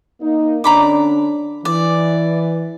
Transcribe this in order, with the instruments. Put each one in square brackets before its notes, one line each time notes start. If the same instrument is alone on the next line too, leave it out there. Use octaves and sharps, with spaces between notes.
[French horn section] A#3 D#4
[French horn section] D3 C#4 D4 [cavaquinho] A#5 B5 D6
[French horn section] E3 [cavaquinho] D5